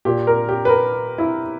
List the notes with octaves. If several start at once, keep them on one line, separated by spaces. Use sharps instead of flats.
A#2 G4
A#4
G4
B4
A#4
E4